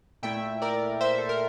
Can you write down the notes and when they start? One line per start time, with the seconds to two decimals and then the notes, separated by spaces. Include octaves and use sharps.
0.23 A#2 A3 E4 E5 G5
0.62 A#4 D5
1.01 C5 E5
1.18 A4
1.29 A#4